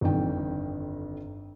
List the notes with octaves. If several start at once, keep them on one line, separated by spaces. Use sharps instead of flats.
G1 F2 D#3 G5